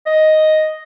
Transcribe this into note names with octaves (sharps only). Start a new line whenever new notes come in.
D#5